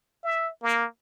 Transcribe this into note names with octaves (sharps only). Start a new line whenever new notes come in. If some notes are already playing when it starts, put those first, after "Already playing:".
E5
A#3